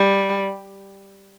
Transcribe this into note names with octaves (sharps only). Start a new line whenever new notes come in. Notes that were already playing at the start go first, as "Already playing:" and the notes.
Already playing: G3